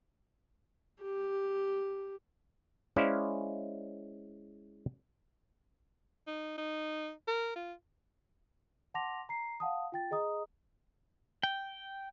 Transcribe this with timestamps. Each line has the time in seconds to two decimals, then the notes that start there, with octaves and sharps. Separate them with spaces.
1.01 G4
2.96 G#3 C#4 E4 C5 D5 F5
6.27 D#4
6.58 D#4
7.28 A#4
7.56 F4
8.94 F#5 A5 C6 D6 A#6 F7
9.29 A#5 C7
9.60 F5 F#5 A5 D#6
9.92 F4 G5 A6
10.11 G#4 D#5 A#5 D#6
11.43 G5